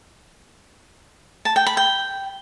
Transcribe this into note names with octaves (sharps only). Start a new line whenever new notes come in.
A5
G5
B5
G5